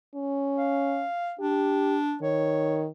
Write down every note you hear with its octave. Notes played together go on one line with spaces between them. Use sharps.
C#4
F5
D4 G4
D#3 C#5